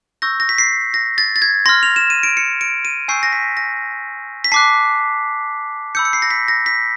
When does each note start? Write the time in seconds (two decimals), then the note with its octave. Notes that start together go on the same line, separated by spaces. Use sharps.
0.22 C#6 E6 G6 A#6
0.40 A#6
0.49 B6
0.58 C7
0.94 A#6
1.18 A6
1.36 A6
1.42 G#6
1.66 C6 F6 A#6
1.83 F7
1.96 E7
2.10 D#7
2.23 D7
2.37 C#7
2.61 D7
2.85 D#7
3.08 G#5 C#6 E6 G6 C7
3.23 A#6
3.33 B6
3.57 A#6
4.44 B6
4.52 A5 D6 F#6 C7
5.95 B5 E6 G6 C#7
6.05 C#7
6.13 C7
6.22 A#6
6.31 B6
6.48 A#6
6.66 B6